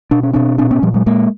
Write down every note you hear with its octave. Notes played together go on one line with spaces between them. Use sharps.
B2 D4
C#4
B2 C4 D4
A#2 C4 D4
B3 C#4
A#2 F3 G3
F#3 G#3
A#2 G#3 A#3